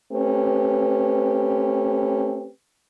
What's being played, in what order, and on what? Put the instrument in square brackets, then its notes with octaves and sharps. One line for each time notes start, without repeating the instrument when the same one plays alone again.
[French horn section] A3 C4 C#4 G4 B4